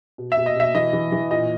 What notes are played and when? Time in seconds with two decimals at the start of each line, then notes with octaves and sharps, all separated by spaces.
0.18 B2
0.32 E5
0.37 B2
0.46 D#5
0.56 B2 E5
0.75 E3 D#5
0.93 E3
1.12 E3
1.31 A#2 D#5